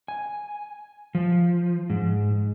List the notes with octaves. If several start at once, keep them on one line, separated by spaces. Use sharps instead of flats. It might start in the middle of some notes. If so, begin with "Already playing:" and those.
G#5
F3
G#2